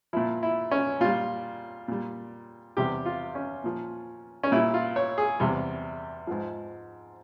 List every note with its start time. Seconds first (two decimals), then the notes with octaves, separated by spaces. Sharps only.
0.13 A#2 F3 E4
0.43 E4
0.71 C#4
1.01 A#2 G3 F4
1.88 A#2 G3
2.77 E2 C3 G3 G4
3.06 F4
3.35 C#4
3.64 A#2 F3
4.44 C#4
4.52 A#2 G3 E4
4.74 F4
4.96 C#5
5.18 G#4
5.40 E2 C3 G3
6.27 G#2 F3